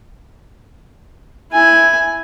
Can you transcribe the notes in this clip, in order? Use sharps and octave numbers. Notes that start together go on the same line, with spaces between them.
E4 G#5